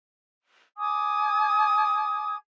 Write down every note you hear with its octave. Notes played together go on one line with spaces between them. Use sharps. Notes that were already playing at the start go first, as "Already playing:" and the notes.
G#5 D6 D#6 G#6